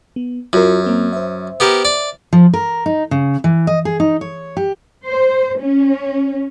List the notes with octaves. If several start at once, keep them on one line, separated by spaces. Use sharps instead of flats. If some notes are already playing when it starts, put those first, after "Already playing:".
B3
F#2 F4 F#4 A#4
A#3 C4 A#4
C5 E5
B3 G4 A#4
D5
F3
A#4
D#4
C#3
E3
D#5
G#4
D#4
C#5
G4
C5
C#4